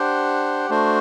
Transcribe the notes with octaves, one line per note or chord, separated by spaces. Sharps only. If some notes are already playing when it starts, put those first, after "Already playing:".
Already playing: D4 G4 C5 F#5
A3 D4 F#4 C5